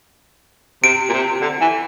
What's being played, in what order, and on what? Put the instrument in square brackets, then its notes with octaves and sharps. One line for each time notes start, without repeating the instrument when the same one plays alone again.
[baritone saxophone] C3 [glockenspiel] D7
[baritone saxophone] A#2
C3
D3
E3